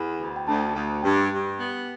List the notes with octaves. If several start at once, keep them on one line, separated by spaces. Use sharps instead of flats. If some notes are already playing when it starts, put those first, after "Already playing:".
Already playing: E2 B5
D2
G5
D2 A5
D2
G2 G5
G2
B3